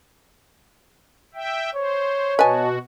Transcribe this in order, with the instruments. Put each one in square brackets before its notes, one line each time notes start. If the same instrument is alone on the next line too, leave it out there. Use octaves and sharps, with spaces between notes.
[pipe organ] E5 G5
[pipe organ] C5 [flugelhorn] C#5
[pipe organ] B2 F#4 [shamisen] B4 G#5 [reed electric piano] D#5 A5